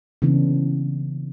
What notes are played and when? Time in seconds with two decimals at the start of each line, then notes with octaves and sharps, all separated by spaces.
0.22 C#3 E3 A#3 B3 C#4 D4